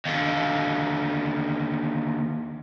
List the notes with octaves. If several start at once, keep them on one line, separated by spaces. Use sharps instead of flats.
D#2 D3